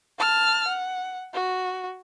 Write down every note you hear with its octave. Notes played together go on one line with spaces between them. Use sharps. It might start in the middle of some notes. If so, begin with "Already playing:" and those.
A5 F6
F#5
F#4